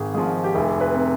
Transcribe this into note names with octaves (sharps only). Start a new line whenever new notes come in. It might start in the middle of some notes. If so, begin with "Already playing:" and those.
Already playing: G#1 G#4
G#2 F3 G#4
G4
F1 G#4
B4
C3